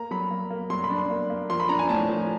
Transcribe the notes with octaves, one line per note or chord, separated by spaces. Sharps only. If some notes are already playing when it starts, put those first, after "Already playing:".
Already playing: A#3 A#5
F#3 B5
A#3
A#3
F#3 C6
B5
D4
C6
A#3
A#3
F3 C6
B5
D4 A#5
G#5
A2 A5
F3